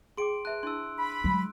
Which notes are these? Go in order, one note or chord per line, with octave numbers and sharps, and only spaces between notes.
G#4 G5 C6 D6 D7
B4 E5 A5 F#6
D4 E4 A5 C6 E6
B5
F#3 G#3